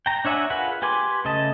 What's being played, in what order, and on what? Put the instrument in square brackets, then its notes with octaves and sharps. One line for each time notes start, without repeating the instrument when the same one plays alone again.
[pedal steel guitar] G5 A#5
D4 C#5 E5 F#5 G#5
F4 G#4 A#4 B4 F#5
G4 B4 G#5 C6 D6
C#3 A3 D#5 A5